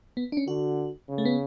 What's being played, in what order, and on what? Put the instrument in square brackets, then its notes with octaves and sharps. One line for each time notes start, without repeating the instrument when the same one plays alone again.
[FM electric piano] B3
D4
C#4
[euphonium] D3 [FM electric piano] F#4
[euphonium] C#3
[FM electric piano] A3
B3